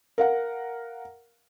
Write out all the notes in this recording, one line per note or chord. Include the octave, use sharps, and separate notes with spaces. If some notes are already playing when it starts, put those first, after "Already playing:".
A#4 F5 F#5